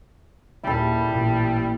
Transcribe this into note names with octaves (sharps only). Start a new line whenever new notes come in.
D#2 A#2 G3 E4 A4
A1 A#2